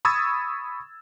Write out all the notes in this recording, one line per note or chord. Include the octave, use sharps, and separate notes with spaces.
B5 C#6 D#6 E6 G#6 A6